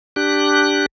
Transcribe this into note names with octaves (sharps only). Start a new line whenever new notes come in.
D4 G4 F#6